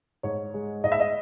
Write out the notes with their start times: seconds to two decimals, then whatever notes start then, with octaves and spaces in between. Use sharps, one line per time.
0.23 G#2 C#5
0.54 G#3
0.84 G#2 D#5
0.92 E5
1.00 D#5